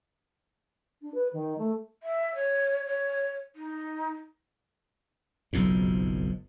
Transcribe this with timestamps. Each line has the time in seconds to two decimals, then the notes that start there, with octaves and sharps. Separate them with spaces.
1.01 D4
1.14 B4
1.33 D#3
1.58 A3
2.03 E5
2.35 C#5
2.86 C#5
3.56 D#4
5.53 F#1 B1 F2 G#2